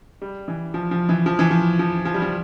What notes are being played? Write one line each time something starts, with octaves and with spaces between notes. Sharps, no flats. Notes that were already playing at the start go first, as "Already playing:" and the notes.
G3
E3
F3
F3
E3
F3
E3
F3
F3
F3
G3
F3